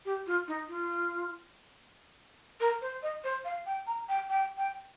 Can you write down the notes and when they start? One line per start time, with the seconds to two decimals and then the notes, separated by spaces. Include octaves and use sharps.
0.05 G4
0.27 F4
0.48 D#4
0.68 F4
2.60 A#4
2.81 C5
3.03 D#5
3.24 C5
3.45 F5
3.66 G5
3.87 A#5
4.09 G5
4.30 G5
4.57 G5